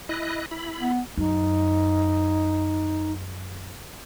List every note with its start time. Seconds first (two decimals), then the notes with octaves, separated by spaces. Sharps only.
0.09 E4 D#5 F#6
0.51 E4 B5
0.78 B3
1.17 F#2 D#4